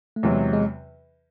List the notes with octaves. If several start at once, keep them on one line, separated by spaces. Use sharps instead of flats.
A3
E2 C3 F#3 G#3
G#3